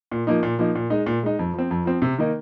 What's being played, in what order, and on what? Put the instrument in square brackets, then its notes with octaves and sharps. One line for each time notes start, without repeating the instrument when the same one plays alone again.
[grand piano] A#2
F3 A#3 D#4
A#2
F3 A#3 D#4
A#2
G#3 D#4
A#2
G#3 D#4
F2
F3 C4
F2
F3 C4
C3
D#3 A#3 D#4